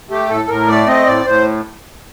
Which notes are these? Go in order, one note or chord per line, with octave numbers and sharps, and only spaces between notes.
A3 G4
A2 A4
A2 A#4
A3 D5
C4 D#5
A2 D5
A2 C5